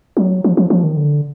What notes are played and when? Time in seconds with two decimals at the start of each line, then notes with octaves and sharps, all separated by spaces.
0.17 F#3
0.44 F3
0.57 F3
0.70 F3
0.84 D#3
0.97 D3